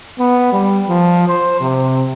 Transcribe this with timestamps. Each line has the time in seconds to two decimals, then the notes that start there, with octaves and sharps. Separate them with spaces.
0.19 B3
0.53 G3
0.89 F3
1.28 C5
1.61 C3